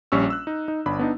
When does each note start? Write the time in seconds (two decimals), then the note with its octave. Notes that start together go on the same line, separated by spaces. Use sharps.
0.12 A#1 G3 C#4 C#6 E6
0.30 E6 F#6
0.47 D#4
0.68 D#4
0.86 G1 D4 B5
0.99 B3 D4 D#4